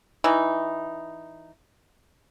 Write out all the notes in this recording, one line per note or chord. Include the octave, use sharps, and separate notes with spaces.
E3 D#4